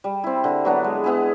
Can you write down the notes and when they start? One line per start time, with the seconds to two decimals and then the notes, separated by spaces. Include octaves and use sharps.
0.04 G3
0.24 C4 E4
0.44 D3
0.65 F#3 B3 D4
0.84 G#3
1.04 B3 E4 G#4